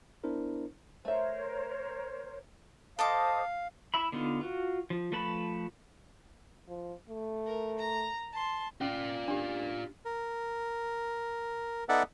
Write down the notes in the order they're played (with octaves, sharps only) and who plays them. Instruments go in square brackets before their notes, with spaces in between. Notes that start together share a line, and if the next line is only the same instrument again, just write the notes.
[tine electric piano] B3 D4 E4 A#4 C5
[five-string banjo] A3 E5 [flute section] A#4 C5 C#5
[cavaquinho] A4 A5 D6 [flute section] C5 D#5 D#6 [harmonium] F5
[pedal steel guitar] E4 E5 B5
D3 B3 D#4 F4
F4 F#4
F3
F3 A3 B4 A5 B5
[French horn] F3
A3
[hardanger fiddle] A#4
A#5
A5 C6
[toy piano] C#4 [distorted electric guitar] F4 D5
[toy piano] D4 G4
[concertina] A#4
B3 D#4 A4 D5 E5 F#5